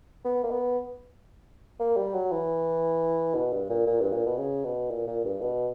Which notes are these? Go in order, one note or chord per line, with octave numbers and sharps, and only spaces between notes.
B3
A#3
B3
A#3
G3
F#3
E3
B2
G2
A#2
A#2
G2
A#2
B2
C#3
B2
A#2
A#2
G2
B2